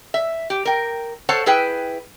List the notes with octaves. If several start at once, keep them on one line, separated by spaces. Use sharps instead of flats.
E5
G4
A#4 G5
A4 C5 C#5 F#5 A5
E4 G#4 B4 G5